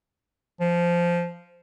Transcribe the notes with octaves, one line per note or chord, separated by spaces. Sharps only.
F3